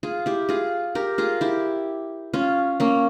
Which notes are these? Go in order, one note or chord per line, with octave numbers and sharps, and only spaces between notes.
F4 G#4
E4 G4
F4 G#4
G4 A#4
F4 G#4
E4 G4
C#4 F4
A#3 C#4